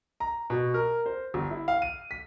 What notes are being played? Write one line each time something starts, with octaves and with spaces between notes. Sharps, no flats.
A#5
B2
A#4
C5
G1
E4
F5
D#7
B6